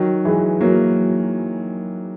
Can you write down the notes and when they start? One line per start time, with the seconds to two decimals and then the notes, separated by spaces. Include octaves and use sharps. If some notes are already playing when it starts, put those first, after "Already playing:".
Already playing: D#3 F#3
0.25 E3 G#3
0.61 F#3 A#3